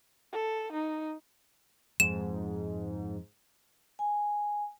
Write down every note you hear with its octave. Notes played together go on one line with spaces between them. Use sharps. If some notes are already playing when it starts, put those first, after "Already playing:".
A4
D#4
F2 G#2 E7
G#5